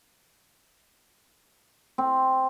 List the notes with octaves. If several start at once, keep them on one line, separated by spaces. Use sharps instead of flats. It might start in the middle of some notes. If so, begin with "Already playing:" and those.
C4